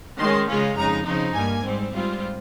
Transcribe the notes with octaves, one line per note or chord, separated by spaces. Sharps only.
D#3 G#3 C#4 C6
C#3 G#3 C#4 F4
F2 C#3 G#3 D#4 A#5
C#3 F3 C4 D#4
G2 G3 A#3 G#5
G#2 G3 C4
G#2 G3 C4 F4